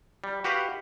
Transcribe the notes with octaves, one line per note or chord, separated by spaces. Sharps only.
G3
F#4 G4 B4 F5 F#5